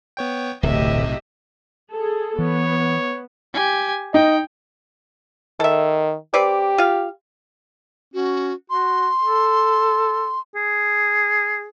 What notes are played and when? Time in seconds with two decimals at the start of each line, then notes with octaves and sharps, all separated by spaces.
0.17 B3 C#5 G5
0.63 D1 B1 A2 C3 G4 D#5 E5
1.92 G#4 A4
2.39 E3 B3 C#5
3.54 G4 G#5
4.14 D#4 D#5 G5
5.60 D#3 A4 E5
6.34 C4 G4 B4 D5
6.78 F4 F5
8.14 C#4 F#4
8.70 F#4 C6
9.23 A4
10.56 G#4